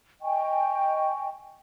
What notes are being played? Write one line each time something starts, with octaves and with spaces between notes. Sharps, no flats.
D#5 G5 G#5 C#6